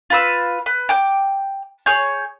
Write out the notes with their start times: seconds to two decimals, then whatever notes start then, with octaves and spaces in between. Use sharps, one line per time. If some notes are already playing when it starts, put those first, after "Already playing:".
0.10 F4 B4 E6
0.66 B4
0.89 G5 D6 G6
1.86 G#4 C#5 G6